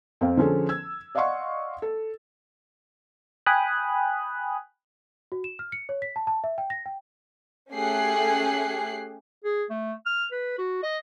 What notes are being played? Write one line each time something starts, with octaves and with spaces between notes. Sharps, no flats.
F2 C4 F5
D3 F3 C#4 G#4 A4 C5
E6 G#6
D5 D#5 F5 F#5 C6 C#6
A4
G5 G#5 B5 D#6 F#6
F#4
E7
F6
C#7
C#5
B6
A5
A5
E5
G5
A#6
G5
A3 C#4 G4 G#4 F#6 C7
G#4
A3
F6
B4
F#4
D#5